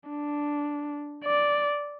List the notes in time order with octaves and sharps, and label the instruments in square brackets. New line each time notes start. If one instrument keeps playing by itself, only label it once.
[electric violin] D4
D5